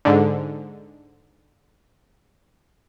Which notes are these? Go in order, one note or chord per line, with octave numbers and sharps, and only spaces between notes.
G#2 D3